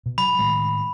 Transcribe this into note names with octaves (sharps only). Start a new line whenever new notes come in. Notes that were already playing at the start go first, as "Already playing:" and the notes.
B2
F#3 B5
A2 D#3 G#3